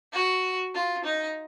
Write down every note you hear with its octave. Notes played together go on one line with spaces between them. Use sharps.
F#4
F4
D#4